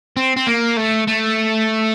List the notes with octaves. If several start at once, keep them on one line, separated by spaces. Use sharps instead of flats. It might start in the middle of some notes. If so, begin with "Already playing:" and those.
C4
C4
A#3
A3
A3